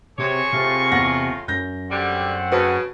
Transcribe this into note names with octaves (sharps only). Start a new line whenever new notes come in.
C3 F#3 G#4 C5 C#5 C#6
A2 C3 F4
E2 F#5 A#6
F#2 G6 A#6
D3 G3 A3 C4 F#5
C#3 F#4 B4 A5